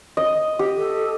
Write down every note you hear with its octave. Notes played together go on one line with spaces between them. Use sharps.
D#5
G4
A4